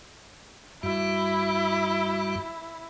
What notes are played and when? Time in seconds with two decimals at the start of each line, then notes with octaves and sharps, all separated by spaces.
0.83 G2 G3 E4 F#4